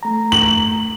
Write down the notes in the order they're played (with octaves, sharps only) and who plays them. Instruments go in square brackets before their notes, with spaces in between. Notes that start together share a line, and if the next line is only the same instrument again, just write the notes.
[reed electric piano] A3 A#5
[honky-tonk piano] F#7